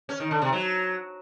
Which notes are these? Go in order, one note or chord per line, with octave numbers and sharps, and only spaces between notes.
C#4
D#3
D3
C3
F#3